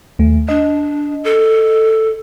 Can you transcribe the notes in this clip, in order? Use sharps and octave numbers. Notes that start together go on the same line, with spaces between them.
D#2 A3
D4 D#5
A4